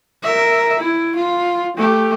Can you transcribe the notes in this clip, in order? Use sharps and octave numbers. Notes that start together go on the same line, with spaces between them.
A#4 E5
E4
F4
A3 G4